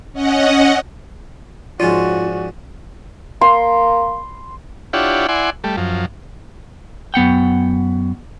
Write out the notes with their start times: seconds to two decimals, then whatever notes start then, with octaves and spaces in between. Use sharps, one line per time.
0.13 C#4 D#5 F#5
1.80 G#2 F3 C#4 F4 F#4 D5 G#5
3.41 A#3 C6
4.93 D4 E4 F4 G4 C#5 F#5
5.29 E4 D5 F#5 G#5 C6
5.64 G3 A3
5.77 F#2 F3
7.14 F#2 B3 F#5 G5